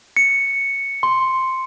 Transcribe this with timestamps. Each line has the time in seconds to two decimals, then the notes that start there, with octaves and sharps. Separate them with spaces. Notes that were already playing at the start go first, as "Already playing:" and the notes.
0.17 C#7
1.03 C6